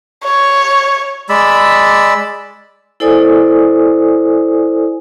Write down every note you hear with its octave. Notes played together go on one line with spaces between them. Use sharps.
C#5
G#3 D5 B5 E6
E4 A4 C5 D5 G#5 D#6